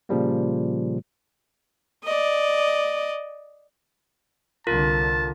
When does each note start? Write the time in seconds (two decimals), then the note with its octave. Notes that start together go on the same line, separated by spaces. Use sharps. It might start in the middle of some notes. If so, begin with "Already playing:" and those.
0.09 A#2 C#3 F3 G3 A#3
2.04 D5 D#5
4.67 C2 D3 F4 A#4 A5